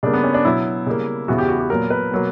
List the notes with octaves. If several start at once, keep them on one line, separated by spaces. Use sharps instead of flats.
C#3 G3 A#3 D4
B3
C#4
D4
B2 F#3 B3 E4
C#3 G3 A#3
E2 C#3 E3 B3 F#4
G4
F#4
G4
A#2 F#3 B3 A#4
B4
B2 F#3 A#3